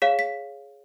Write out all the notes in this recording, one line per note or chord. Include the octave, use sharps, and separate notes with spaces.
G#4 C#5 F5 B6
B6